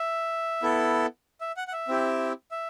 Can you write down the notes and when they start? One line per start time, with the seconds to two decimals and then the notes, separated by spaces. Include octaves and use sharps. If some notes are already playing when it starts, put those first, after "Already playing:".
Already playing: E5
0.63 B3 E4 A4
1.41 E5
1.57 F#5
1.68 F#5
1.73 E5
1.88 C4 E4 G4
2.51 E5